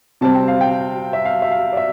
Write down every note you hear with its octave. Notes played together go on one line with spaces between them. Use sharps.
C3 G3 C4 A5
G5
F5
G5
E5
F5
E5
F5
D5
E5